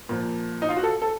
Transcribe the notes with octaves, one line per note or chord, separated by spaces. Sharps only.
A#2 F3
D#4
F4
F#4
A4
A4